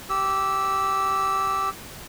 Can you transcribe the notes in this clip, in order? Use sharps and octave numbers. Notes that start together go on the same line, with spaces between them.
G4 E6